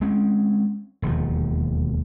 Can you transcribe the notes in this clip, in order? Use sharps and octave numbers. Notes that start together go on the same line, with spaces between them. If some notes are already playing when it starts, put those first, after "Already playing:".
G#3 C4 C#4
E1 D#2 F3